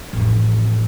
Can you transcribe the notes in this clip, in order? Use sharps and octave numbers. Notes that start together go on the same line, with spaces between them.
A1 F2